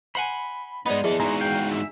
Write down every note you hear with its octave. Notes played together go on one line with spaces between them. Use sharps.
C5 F#5 G#5 B5
G#3 B3 D#4 D5 D#5 B5 D#6
E2 G#4 A4 D#5
G#2 G#3 F#4 A#5
F5 G5
D4 E5 E6